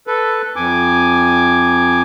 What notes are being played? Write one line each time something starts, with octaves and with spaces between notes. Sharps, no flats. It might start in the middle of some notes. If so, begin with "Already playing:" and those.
A4 B4
F2 G#5 D6